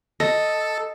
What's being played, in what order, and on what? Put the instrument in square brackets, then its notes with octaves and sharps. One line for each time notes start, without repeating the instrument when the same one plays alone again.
[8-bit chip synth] A4 [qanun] D#5